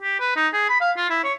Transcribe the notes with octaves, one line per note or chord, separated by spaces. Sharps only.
G4
B4
D#4
G#4
B5
F5
F4
E4
C#5